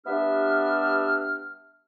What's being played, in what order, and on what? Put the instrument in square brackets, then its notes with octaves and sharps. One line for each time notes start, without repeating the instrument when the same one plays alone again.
[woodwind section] G3 B3 D4 G4 E5 F6